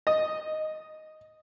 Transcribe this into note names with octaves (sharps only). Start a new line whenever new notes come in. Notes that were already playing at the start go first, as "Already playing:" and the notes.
D#5